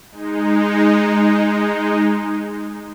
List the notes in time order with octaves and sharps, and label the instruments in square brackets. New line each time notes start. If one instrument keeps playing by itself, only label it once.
[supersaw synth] G#3 D#4